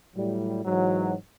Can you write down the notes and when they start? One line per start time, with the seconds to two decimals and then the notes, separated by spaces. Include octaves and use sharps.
0.15 A2 F#3 G3
0.65 G#2 E3 F#3